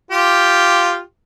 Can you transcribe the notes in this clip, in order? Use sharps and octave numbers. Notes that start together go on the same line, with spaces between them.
F4 G4